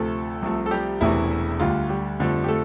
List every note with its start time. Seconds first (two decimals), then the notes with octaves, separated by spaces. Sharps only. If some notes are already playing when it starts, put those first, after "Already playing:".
Already playing: D2 C3 F3 A3 A4
0.42 C2 C3 F3 A3
0.66 A4
0.71 G3 G4
1.01 E1 E2 C3 E3 A3 E4
1.60 D2 D3 G3 F4
1.89 G3 G4
2.19 F2 D3 F3 A3
2.44 G4
2.48 A3 A4